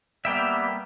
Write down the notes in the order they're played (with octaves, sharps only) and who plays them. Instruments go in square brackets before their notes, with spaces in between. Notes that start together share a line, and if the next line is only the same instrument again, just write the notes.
[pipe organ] G3 A#3 B3 [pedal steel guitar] E5 G5 A#5